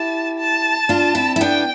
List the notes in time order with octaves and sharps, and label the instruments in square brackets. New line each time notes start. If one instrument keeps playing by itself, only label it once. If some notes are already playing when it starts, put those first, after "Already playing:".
Already playing: [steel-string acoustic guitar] E4 G4 [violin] A5
[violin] A5
[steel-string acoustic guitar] D4 F4
C4 E4
E4
[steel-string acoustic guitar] B3 D4 [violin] G5